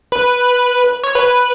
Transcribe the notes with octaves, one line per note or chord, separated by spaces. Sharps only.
B4
C#5
B4